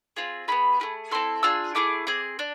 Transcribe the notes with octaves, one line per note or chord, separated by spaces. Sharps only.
C4 F4 G#4
B3 D4 G#4 B5
A3 E4 G#4
C4 E4 A4 C6
D4 F4 G#4 E6
A3 E4 G#4 D6
C4 G#4
D4